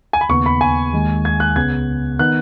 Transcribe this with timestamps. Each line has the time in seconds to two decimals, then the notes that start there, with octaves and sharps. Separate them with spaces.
0.13 G#5
0.21 B5
0.29 D#2 C#3 B3 C#6
0.46 B5
0.61 G#5
0.93 D#2 D#3 G#3
1.25 G#6
1.40 F#6
1.56 C#2 C#3 B3 G#6
2.19 D#3 B3 D#4 F#6